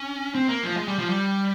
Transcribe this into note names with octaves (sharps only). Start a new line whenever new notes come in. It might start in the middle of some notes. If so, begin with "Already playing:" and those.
Already playing: C#4
C4
A#3
F3
G#3
G3
F3
G3